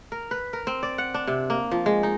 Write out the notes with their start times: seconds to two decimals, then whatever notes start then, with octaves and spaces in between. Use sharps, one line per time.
0.12 A#4
0.31 B4
0.53 A#4
0.67 C4
0.83 D5
0.98 F#5
1.14 D4
1.27 C3
1.50 A#3
1.71 F3
1.86 G#3
2.03 D#4